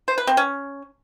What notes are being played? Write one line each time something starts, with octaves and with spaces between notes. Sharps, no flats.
C5
B4
C4
C#4